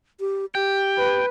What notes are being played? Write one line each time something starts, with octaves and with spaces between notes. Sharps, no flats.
G4
G4 G5
B4